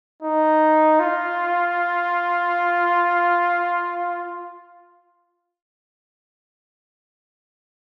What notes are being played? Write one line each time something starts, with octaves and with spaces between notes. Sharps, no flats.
D#4
F4